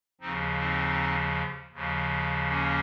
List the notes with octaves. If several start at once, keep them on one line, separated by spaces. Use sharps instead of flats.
D#2 C#3 F3 C4 D#4
C4 D#4
D#2 C#3 F3
A#3 C#4